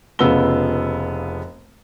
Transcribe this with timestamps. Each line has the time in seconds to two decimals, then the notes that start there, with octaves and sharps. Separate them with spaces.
0.19 F1 C#3 B3 F4 E6 G7